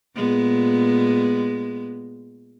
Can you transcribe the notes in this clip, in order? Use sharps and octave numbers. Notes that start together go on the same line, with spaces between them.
A#2 G#3 B3